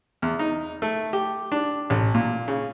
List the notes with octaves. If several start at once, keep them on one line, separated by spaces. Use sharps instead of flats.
E2
D#4
A3
G4
D4
A1
A#2
C#3